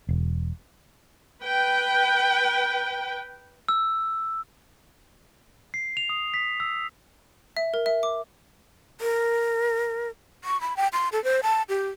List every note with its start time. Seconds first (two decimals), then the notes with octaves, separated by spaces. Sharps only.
0.09 E1
1.43 B4 G5
3.69 E6
5.74 C7
5.97 F7
6.09 D#6
6.34 B6
6.60 E6
7.57 E5
7.74 A#4
7.86 E5
8.03 D6
9.01 A#4
10.44 C#6
10.61 B5
10.77 G5
10.93 C6
11.13 A4
11.24 C5
11.43 A5
11.69 G4